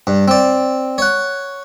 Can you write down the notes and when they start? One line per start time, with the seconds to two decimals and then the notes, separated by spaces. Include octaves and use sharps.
0.07 G2
0.28 C4 D5
0.98 C#5 F#5